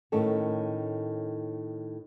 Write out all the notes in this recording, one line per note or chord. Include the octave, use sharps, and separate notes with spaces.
A2 D#3 C#4 A4